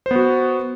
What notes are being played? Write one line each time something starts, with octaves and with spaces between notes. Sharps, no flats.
B3 F#4 C5